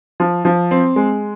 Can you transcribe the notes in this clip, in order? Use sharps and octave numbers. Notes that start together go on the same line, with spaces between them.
F3
F3
C4
G#3